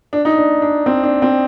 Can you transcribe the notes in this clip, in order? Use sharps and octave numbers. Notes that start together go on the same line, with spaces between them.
D4
D#4
D4
D4
C4
D4
C4